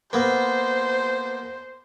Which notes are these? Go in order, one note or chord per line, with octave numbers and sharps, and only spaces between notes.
A#3 B3 C5